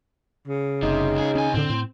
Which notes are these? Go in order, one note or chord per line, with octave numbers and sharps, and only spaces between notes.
C#3
F#1 C3 D#4
C#2 G#4
D#2 C#4 G#5
A2 D3 C4
A2